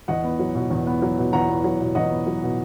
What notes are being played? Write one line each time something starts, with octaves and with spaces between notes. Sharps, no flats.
E2 D#5 F#5
B3
F#3
B2
E2
B3
F#3
B2
E2 F#5 A#5
B3
F#3
B2
E2 D#5 F#5
B3
F#3
B2